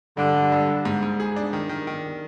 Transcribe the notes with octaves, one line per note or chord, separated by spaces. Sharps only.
G2 D3
G2
G2
G2
G#2
G#2
G#4
D4
D#3
D#3
D#3